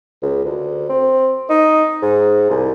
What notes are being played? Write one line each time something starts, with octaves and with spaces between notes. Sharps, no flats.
C#2
D2
C4
D#4
G#2
C2